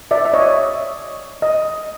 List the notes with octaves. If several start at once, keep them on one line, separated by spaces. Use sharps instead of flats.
D5 E5
E5
C#5 D#5
D#5